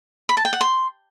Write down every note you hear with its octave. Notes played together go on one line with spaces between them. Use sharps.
B5
A5
G5
F#5
C6